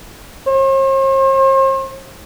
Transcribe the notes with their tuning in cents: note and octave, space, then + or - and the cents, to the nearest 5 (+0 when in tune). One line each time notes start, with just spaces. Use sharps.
C5 +45